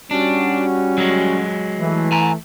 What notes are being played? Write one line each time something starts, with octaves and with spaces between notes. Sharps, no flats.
G3 C#4 D4 F#4
F#3 G#3
E3 A3
G#5 A#5